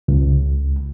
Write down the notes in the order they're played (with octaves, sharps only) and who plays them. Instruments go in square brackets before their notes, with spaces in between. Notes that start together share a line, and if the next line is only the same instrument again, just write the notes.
[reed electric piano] C#2